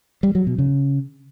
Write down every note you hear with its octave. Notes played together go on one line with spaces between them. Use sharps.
G3
F#3
B2
C#3